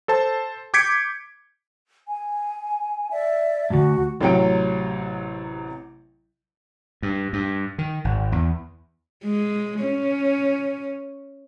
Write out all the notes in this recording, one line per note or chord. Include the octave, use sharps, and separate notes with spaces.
A4 C5 A5
D6 G6 G#6 B6 C#7 D7
G#5
D5 E5
D2 G2 F#4
A1 C3 F#3 G5 D7
G2
G2
D#3
G#1
E2
G#3
C#4